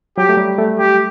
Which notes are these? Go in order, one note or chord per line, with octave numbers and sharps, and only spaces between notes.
F#3 G4
A3
G3
A3
G4